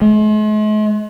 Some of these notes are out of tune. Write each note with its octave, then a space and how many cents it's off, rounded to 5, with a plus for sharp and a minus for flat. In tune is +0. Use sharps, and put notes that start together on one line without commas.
G#3 +45